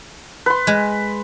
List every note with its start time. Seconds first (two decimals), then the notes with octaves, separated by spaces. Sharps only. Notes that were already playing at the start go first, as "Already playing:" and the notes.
0.46 B4 C6
0.67 G#3